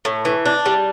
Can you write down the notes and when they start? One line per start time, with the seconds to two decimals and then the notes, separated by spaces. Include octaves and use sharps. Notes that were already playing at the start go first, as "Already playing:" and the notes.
0.05 A2
0.25 E3
0.45 D4
0.66 G3